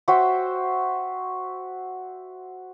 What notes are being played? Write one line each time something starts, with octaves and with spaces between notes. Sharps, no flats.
F#4 C5 E5 G5